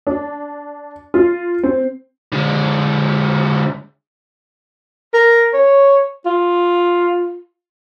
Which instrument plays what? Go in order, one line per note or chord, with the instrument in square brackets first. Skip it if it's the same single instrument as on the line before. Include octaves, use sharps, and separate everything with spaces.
[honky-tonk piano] D4
F4
C4
[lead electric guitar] D3 G#3
[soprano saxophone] A#4
C#5
F4